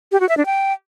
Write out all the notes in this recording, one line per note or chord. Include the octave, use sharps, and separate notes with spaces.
G4
F#4
E5
D4
G5